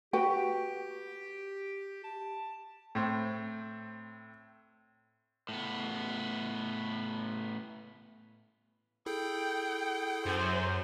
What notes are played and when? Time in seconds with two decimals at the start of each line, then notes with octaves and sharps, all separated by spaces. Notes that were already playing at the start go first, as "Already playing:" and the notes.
0.13 F#4 G4 B4 G5
2.04 A5
2.95 A2 C4
5.49 A2 B3
9.06 E4 G#4 A4 G5
10.26 F#2 C5